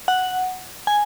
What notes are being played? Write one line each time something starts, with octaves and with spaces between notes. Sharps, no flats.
F#5
G#5